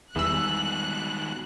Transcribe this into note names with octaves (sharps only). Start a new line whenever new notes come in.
E2 G#2 B2 D#3 G3 E6 F#6